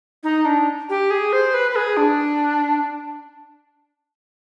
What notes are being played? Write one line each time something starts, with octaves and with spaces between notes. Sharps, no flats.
D#4
D4
G4
G#4
C5
B4
B4
G#4
D4